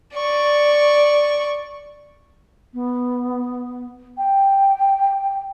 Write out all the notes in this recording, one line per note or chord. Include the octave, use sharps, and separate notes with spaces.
D5 C#6
B3
G5